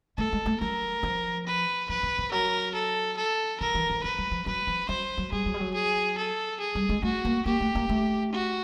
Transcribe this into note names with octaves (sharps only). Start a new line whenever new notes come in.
A3 A4
G#3
A3
F#3 A#4
F3
B4
F3 B4
E3
F3
F#3 A#4
A4
A4
E3 A#4
E3
F3
F3 B4
F#3
F3
F#3 B4
F3
F#3 C5
F#3
G3 G#4
F#3
G3
F#3
G#4
A4
G#4
G3
G#3
A3 F#4
A#3
A#3 G4
A3
A#3
A3
F#4